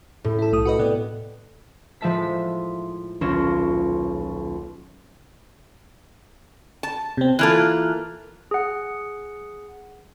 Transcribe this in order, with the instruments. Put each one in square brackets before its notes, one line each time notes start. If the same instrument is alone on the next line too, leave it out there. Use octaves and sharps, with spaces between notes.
[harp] A2
[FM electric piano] E4 A4
B1 A3 D#6
F#4 B4 D#5
C3 B3 D5
[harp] A2 F3 G#3 E5 A5 B6
D#1 B1 C#4 F4 A#6 E7
[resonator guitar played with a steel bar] A5
[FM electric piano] C3 C4
[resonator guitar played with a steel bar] E3 A#3 F4 [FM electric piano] A4 F6 F#6
[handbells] G#4 F#5